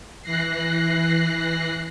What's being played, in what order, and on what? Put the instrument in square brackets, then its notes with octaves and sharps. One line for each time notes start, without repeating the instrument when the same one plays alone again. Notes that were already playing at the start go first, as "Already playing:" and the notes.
[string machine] E3 F#6 A#6 C7